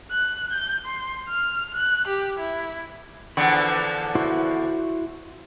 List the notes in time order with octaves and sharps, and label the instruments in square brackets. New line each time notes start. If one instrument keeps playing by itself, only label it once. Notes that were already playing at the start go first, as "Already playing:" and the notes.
[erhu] F#6
G6
C6
F6
F#6
G4
E4
[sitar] E2 D3 F3 [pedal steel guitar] B5
[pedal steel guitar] E4 F#4 C5